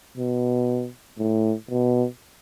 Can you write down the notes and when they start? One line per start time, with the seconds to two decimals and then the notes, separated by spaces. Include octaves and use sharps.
0.17 B2
1.18 A2
1.70 B2